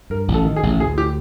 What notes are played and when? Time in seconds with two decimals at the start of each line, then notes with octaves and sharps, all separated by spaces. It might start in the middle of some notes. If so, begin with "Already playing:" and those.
0.10 G2 A#4
0.28 A1
0.34 A4
0.45 D#3
0.56 G#4
0.63 A1
0.80 D2 G#4
0.98 G4